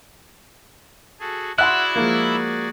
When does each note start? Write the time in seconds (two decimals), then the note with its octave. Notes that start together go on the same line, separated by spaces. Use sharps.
1.20 F#4 G#4 A4
1.58 E4 F#4 G#4 D5 E5 F#5 C6 F#6
1.96 F3 G#3 A#3